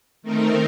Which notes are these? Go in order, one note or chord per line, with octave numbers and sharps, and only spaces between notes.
D#3 A3 C4 D#4 A#4